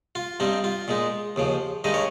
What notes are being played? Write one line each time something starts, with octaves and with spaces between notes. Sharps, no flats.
F4
G2 G3 C4 D#4
F4
A#2 G#3 D#4
D#2 C#3 F3
G2 D#3 G#3 D#4 D#5
C#5